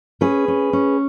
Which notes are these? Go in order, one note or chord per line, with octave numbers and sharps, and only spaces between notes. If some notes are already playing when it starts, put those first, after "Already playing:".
C#4 G#4 B4
C#4
C#4